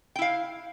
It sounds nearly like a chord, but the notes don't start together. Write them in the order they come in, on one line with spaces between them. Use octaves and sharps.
G5 E4 F5